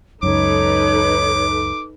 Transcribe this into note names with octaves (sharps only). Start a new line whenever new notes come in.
C#2 F#2 D#4 A4 B4 C#5 D6